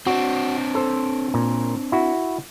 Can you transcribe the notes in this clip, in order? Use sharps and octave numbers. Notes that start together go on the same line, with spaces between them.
C4 D4 F#4
A4 C5
A#2
E4 F#4